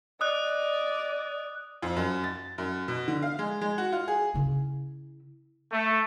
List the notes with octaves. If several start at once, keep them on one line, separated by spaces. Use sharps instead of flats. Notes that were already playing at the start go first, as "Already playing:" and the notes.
D5 D#5 D#6 F#6
F2
F#2
A6
F#2
B2
D3
F5
G#3
G#3
F#4
F4
G#4
C#3 E4
A3